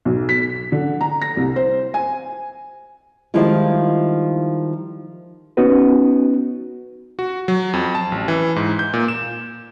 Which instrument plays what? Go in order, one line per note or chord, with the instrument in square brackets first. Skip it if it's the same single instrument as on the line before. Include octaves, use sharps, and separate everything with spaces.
[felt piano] B1
B6
D3
A#5
A#6
C2
C5
G#5
[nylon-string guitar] D#3 F3 G3 G#3 E4 F4
[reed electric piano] B3 C#4 D#4 F#4 B4
[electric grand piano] F#4
F#3
F2
A5
A1
E3
G#2
G6
A#2
E7